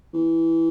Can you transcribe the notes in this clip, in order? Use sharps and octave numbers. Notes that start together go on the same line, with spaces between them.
E3